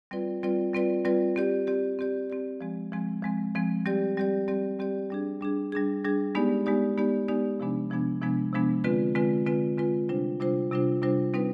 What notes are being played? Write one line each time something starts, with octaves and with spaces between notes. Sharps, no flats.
G3 C4 F4 B4 D5
G3 C4 F4 B4 D5
G3 C4 F4 B4 D5
G3 C4 F4 B4 D5
C4 G4 D5
C4 G4 D5
C4 G4 D5
C4 G4 D5
F3 G#3 C4
F3 G#3 C4
F3 G#3 C4
F3 G#3 C4
G3 C4 G4 D5
G3 C4 G4 D5
G3 C4 G4 D5
G3 C4 G4 D5
G3 D4 G#4
G3 D4 G#4
G3 D4 G#4
G3 D4 G#4
G#3 B3 D#4 G4 D5
G#3 B3 D#4 G4 D5
G#3 B3 D#4 G4 D5
G#3 B3 D#4 G4 D5
C3 F3 G#3 B3 D4
C3 F3 G#3 B3 D4
C3 F3 G#3 B3 D4
C3 F3 G#3 B3 D4
D3 G#3 C4 F4 B4
D3 G#3 C4 F4 B4
D3 G#3 C4 F4 B4
D3 G#3 C4 F4 B4
C3 G3 D4 F4 C5
C3 G3 D4 F4 C5
C3 G3 D4 F4 C5
C3 G3 D4 F4 C5
G3 C4 D#4 B4